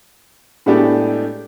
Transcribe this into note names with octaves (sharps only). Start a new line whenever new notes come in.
A2 G#3 A3 B3 D4 G4